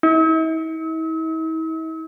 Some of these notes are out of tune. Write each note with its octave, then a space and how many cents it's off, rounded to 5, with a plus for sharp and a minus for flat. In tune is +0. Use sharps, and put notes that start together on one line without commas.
E4 -45